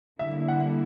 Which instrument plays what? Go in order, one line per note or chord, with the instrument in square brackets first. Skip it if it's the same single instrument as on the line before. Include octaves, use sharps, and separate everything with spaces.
[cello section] D3 G3 A#3 E4 [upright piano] E5
[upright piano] F#5